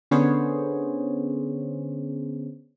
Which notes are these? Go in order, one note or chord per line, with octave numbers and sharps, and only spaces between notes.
D3 B3 C#4 G#4 C5 C#5